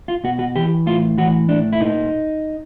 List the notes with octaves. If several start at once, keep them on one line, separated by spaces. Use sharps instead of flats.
F4
B2 F#4
F#4
E3 G4
A2 F4
E3 F#4
A2 D4
E4
A#2 D#4